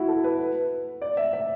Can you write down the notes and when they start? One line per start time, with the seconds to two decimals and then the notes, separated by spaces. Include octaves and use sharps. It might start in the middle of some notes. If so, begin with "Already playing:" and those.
Already playing: E4 F#4
0.08 A4
0.24 B4
1.02 D5
1.17 E5
1.33 E5